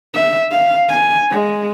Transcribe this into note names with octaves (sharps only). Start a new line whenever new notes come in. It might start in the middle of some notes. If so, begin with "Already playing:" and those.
E5
F5
G#5
G#3